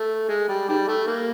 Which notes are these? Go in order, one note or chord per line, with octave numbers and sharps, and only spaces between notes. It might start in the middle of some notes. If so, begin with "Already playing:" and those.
Already playing: A3
G#3
G3
D#3 G3
A3
A#3